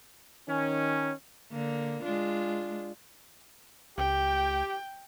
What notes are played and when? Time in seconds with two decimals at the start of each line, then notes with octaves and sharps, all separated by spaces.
0.48 D#3 C#4
1.52 D3 A#3
2.03 G#3 D4 F4
3.98 C#2 G4 G5